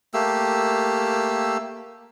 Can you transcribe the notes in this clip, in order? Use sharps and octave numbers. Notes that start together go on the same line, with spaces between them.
A3 A#3 G4 E6